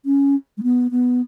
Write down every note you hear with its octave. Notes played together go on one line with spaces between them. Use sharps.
C#4
G#3
B3
B3